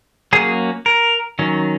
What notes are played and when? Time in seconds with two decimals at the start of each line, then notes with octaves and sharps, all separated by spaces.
0.33 F#3 A#3 C#4 G#4
0.86 A#4
1.39 D#3 F#3 C#4